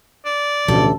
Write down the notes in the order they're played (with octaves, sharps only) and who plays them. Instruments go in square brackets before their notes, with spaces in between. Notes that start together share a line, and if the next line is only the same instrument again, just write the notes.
[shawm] D5
[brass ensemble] A1 D2 [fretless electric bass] B2 F3 [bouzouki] A4